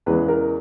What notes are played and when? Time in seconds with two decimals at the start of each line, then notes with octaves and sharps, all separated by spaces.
0.06 E2 C#3 E3 G#3 B4
0.28 A#4